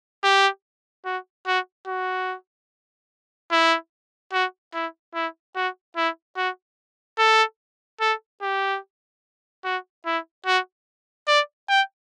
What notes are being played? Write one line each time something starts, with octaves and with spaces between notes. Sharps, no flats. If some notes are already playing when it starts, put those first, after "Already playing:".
G4
F#4
F#4
F#4
E4
F#4
E4
E4
F#4
E4
F#4
A4
A4
G4
F#4
E4
F#4
D5
G5